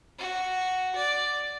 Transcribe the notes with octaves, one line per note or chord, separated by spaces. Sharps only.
F#4
D5